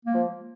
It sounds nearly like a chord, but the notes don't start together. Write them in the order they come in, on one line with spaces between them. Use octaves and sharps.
A#3 G#3 F3